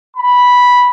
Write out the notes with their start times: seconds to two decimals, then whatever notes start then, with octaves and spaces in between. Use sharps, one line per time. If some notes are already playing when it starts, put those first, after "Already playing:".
0.17 B5